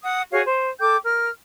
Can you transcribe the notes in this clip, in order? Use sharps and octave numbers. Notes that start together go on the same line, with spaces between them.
F#5 D#6
F#4 G#4 C#5 F5
C5
A4 G5 D6 G6
A#4 F6